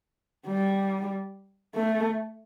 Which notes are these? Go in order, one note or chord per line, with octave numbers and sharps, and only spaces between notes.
G3
A3